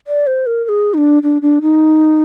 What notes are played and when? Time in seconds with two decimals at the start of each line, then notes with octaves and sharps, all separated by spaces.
0.07 D5
0.27 C5
0.46 A#4
0.65 A#4
0.69 G#4
0.94 D#4
0.98 D4
1.23 D4
1.42 D4
1.62 D#4